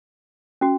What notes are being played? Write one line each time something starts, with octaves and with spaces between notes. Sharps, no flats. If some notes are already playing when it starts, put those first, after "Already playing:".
C#4 F#4